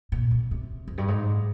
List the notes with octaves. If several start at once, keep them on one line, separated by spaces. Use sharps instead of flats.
A#2
C3
C3
F2
G2
G#2